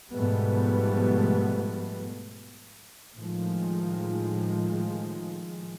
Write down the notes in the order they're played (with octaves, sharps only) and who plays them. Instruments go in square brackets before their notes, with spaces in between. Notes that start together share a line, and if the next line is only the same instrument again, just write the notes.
[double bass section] G#2 B2 F3 G3 A3 B3
A2 D#3 F3 G#3